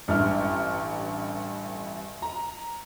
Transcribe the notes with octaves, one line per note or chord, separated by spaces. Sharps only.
A1 G2 E4 F6
A#5